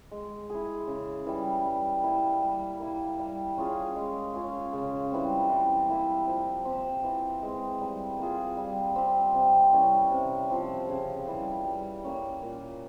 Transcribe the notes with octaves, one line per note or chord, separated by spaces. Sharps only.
G#3
E4 G#4
C#3
E3 G3
G3
A#3 E4
G3
A#3 E4
G3
C#4 F4 G#4
G#3
C#4 F4 G#4
C#3
E3 G3 C4
E3
A#3 E4 G4
F3
C4 G4
E3
G#3 C4
G3
A#3 F4 G#4
G3
C4 G4
C3
E3 G3 C#4
C3
F3 C4 G4
C#3
E3 G3
G3
A#3 C#4
A#2